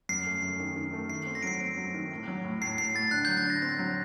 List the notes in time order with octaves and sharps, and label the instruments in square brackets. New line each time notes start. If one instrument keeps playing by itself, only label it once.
[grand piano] F#2 [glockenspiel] C7
[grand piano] A3
F#2
D#3
D#3
A3
[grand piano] D#3 [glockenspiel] C7
[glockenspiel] C7
[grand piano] C4
[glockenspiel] A#6
[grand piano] F#3 [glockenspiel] C7 D7
[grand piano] C4 [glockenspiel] C7
[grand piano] F#3
D#3
A2
F#3
A2
[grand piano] A2 [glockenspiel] C7
[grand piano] A2 [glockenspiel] C7
[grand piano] A2 [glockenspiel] A6
[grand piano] D3 [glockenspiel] F#6
[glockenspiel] G6
[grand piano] F#3
[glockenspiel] A6
[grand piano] D3 [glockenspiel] A#6
[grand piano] C4 [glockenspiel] A#6
[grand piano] F#3